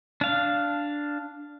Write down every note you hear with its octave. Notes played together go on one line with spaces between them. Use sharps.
D4 F5